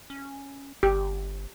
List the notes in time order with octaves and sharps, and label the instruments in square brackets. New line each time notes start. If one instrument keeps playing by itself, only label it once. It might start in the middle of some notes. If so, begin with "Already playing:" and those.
[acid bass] C#4
[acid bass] G1 [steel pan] G4